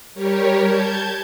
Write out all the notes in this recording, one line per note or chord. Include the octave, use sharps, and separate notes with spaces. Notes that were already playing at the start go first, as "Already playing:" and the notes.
G3 G4 A#4 C#5
A5 G6 G#6